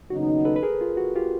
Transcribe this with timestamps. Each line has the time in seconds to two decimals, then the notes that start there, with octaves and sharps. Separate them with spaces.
0.10 D#2 C#3 F#3 B3 D#4 F#4
0.45 A4 B4
0.56 B4
0.63 G#4 A#4
0.81 F4
0.97 F#4
1.15 F4 G4